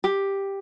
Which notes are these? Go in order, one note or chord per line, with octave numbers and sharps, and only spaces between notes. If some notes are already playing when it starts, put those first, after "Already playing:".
G4